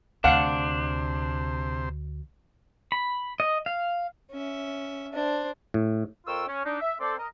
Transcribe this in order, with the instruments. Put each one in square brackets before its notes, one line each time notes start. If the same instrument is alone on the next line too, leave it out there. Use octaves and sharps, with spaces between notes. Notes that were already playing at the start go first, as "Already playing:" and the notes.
[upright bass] D2 [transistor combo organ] C3 C5 [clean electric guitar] D4 [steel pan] F5 F#5
[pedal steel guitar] B5
D#5
F5
[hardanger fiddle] C#4 E5
D4 C5
[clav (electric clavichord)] A2
[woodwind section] F2 F4 A#4 G5 C#6 E6
C#4
D4 D#4
E5
C4 A4 C5 D5
A#4 D#5